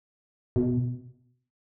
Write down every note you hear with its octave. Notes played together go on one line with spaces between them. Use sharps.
B2